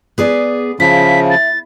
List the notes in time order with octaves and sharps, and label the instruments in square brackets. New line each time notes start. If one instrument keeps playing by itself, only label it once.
[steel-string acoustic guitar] B3 G#4 D5
[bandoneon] C#3 F3 [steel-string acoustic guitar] E4 [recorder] B6
[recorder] A6